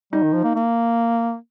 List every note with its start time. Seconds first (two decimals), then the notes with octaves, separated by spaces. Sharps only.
0.13 G3 D#4
0.23 D#3
0.33 F3
0.44 A#3
0.55 A#3